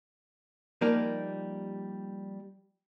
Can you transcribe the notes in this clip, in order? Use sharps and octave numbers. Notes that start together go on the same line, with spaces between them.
F3 G3 A#3 D#4 G4 A#4